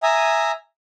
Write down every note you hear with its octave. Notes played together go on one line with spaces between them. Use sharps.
E5 G#5 A#5 D#6